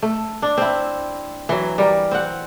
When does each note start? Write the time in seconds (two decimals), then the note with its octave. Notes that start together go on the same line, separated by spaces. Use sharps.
0.02 A3
0.42 D4
0.58 C4 E4
1.49 E3 F#3
1.78 G3 A#4
2.11 C4 F#5